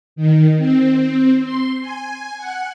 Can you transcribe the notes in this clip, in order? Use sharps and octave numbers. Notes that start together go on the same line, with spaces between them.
D#3
C4
C6
G#5
F#5